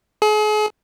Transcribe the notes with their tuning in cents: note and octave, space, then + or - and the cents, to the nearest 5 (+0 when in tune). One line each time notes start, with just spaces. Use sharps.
G#4 +40